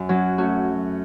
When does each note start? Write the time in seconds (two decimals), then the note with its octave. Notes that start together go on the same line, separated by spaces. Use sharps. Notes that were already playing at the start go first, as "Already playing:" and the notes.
Already playing: F#2
0.09 F#3 C#4 F#4
0.38 A3 C#4 F#4